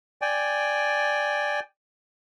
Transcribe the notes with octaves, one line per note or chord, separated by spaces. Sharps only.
D5 G5 G#5